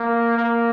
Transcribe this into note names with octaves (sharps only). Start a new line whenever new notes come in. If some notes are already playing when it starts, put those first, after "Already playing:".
Already playing: A#3
A#3